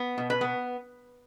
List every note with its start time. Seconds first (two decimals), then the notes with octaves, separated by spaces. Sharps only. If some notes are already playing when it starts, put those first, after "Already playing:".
Already playing: B3
0.18 B2
0.30 B4
0.41 B3